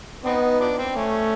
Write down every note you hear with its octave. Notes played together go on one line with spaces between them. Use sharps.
B3 C4 D#4
F3 D4
C4
A3 C#4